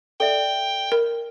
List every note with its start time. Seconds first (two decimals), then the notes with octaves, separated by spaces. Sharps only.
0.20 A4 D5 E5 G5
0.92 A#4